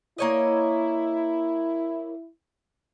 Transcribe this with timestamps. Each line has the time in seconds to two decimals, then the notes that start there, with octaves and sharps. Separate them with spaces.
0.18 A#3 E4 C#5 D#5